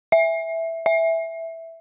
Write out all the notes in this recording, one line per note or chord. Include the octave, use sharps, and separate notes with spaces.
E5
E5